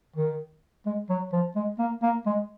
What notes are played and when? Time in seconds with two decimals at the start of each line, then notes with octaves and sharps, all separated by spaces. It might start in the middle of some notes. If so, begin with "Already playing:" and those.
0.16 D#3
0.86 G#3
1.10 F#3
1.33 F3
1.56 G#3
1.79 A#3
2.02 A#3
2.26 G#3